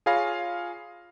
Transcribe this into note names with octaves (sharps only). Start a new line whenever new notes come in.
F4 G#4 C#5 F5 B5 A#6